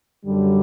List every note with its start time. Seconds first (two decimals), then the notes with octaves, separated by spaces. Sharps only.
0.24 F#2 D3 G3